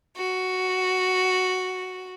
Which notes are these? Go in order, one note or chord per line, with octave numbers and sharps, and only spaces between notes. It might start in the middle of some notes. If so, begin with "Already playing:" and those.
F#4